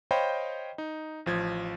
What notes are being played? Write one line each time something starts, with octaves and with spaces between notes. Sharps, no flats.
C5 C#5 D#5 F5 G5 B5
D#4
A1 F3 G#6